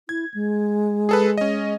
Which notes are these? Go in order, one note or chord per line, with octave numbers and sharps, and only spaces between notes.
E4 G#6
G#3
G#4 A4 B4
C#4 D#5